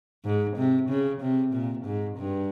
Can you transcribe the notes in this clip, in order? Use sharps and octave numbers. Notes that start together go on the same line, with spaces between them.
G#2
C3
C#3
C3
A#2
G#2
G2